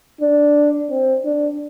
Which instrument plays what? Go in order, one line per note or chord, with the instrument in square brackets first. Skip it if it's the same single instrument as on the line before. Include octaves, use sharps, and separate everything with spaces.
[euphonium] D4
C4
D4